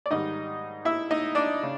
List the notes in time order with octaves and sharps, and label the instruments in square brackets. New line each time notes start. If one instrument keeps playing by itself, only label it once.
[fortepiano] D5
G#2 D#3 G3 D#4 D#5
E4 E5
D#4 D#5
D4 D5
C#3